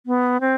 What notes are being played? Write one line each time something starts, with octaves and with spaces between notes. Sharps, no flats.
B3
C4